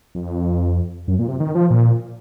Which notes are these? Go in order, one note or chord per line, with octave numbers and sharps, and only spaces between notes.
F2
F#2
A#2
C3
D#3
F3
A#2